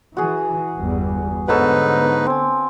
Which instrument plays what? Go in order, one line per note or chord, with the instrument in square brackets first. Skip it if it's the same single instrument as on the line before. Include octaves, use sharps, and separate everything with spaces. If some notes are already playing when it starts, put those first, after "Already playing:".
[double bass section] E3 [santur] F#4 G#4
[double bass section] G1 E2 G3
[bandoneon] G#2 D#4 B4 [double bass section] D3 B3 [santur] A4 C#5 F#5
[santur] C4 G#5